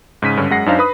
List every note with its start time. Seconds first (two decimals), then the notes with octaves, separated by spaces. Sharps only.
0.22 G#2 C#3 B6 D#7
0.37 G2 D3 C#4
0.50 F#2 G#3 F#5 A#6 C7
0.66 F#2 D4 D#4 C5 F5
0.79 B4 B5 D#6